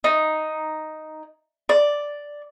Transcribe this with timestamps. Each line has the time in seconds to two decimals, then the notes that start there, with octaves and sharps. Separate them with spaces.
0.04 D#4
1.69 D5